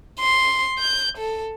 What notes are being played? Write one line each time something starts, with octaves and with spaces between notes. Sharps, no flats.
C6
G6
A4